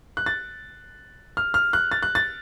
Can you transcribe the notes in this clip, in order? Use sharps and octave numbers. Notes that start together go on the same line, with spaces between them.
F#6
A6
F6
F6
F#6
A6
F#6
A6